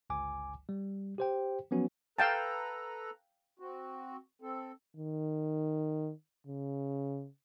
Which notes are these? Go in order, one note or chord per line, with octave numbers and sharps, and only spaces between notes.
G1 C#2 G#5 D6
G3
G4 C5 G5
F3 F#3 B3 C#4 F#4
A4 B4 F5 G5 A5 A#5
C4 F#4
C4 A4
D#3
C#3